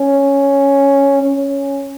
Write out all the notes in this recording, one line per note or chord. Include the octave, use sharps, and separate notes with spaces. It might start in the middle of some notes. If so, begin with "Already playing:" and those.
Already playing: C#4
C#4